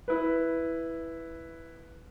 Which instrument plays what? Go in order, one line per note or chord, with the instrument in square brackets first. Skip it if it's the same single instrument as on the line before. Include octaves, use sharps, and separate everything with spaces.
[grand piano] E4 B4